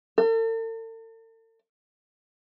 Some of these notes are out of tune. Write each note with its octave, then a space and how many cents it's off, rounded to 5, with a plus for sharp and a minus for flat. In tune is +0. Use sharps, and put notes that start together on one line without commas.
A4 +45